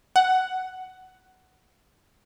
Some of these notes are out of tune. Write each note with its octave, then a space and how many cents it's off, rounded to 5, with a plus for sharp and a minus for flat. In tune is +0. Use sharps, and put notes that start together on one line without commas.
F#5 +10